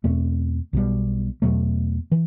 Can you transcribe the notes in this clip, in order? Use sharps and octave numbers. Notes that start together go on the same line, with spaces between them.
E2 B2 A3 C4
B1 B2 G3
E2 B2 F#3 A3
E3